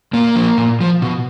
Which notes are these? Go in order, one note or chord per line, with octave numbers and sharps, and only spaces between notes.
A#2 A#3
F3
A#2
F3
B2